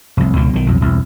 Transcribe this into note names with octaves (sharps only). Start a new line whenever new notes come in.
F1 C2
C#2 B2 D#3
B1 D#3
B1 F2
E1 C2